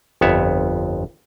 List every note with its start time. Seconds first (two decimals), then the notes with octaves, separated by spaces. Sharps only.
0.21 G1 F2 B3 C#5 E5